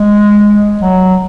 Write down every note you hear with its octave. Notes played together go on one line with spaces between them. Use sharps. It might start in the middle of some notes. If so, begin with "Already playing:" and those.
Already playing: G#3
F#3